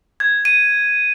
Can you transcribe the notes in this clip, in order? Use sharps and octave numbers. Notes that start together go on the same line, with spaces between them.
G#6
D#7